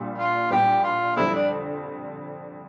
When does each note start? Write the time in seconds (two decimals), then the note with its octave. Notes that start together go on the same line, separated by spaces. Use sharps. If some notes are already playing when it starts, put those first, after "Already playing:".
Already playing: A#1 A#2 G3
0.18 F4
0.50 A#1 A#2 G3 G4
0.84 F4
1.16 F2 D3 G3 C4 E4
1.34 D4